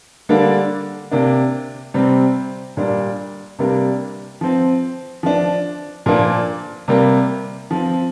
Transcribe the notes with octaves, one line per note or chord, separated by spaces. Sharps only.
D3 G3 A#3 D4
C3 A#3 D4
C3 G3 C4
A#2 G3 D4
C3 G3 A#3 D4
F3 C4
F3 D4
A#2 F3 A#3 D4
C3 G3 A#3
F3 C4